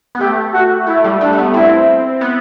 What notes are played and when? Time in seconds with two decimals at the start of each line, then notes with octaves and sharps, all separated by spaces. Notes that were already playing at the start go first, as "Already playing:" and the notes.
0.15 B3
0.20 A3 G4
0.53 F#4
0.87 A3 E4
1.04 G3
1.21 A3 D4
1.33 A3
1.38 B3
1.54 C4 E4
2.21 B3